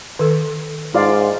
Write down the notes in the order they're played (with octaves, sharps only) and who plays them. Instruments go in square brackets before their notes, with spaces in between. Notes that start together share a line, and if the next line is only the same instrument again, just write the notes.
[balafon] D#3 A4
[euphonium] G#2 [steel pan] F4 D5 F5